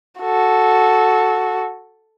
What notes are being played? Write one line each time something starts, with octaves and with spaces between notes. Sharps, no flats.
F#4 A4